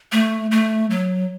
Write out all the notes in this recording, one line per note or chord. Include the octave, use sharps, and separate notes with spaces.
A3
A3
F#3